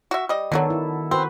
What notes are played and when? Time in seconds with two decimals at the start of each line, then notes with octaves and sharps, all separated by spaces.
0.11 F#4 E5
0.29 G3 D#5
0.52 B2 D3 D#3 F#3 B3 A4
0.70 E4
1.11 C4 F#4 A#4 B4